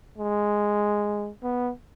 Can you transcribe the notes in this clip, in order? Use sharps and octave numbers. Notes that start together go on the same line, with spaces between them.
G#3
B3